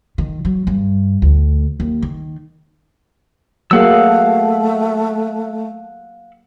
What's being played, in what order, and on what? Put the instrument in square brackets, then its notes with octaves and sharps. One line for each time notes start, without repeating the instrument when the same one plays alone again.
[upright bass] D#3
F#3
G2
D2
D#2
D#3
[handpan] F#3 A#3 G#4 [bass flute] A3 [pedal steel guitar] F5 F#5 E6